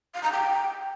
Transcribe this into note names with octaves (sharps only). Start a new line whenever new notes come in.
F5
A#5
G5